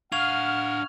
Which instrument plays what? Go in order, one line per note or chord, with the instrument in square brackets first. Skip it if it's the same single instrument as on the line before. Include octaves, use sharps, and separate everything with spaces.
[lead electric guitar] D4 F5 [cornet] F#5 [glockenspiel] C#6 G#6 F7 [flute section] F6